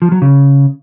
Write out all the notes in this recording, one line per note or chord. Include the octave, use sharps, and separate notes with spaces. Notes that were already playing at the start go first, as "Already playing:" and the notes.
F3
F#3
C#3